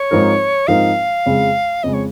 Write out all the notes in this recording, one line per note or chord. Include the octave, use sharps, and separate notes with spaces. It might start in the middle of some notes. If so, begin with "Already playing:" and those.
Already playing: C#5
G#2 F3 C4 D#4 A#4
G#2 F3 C4 D#4 A#4 F5
F2 C#3 G#3
F2 C#3 G#3 D#5
C#5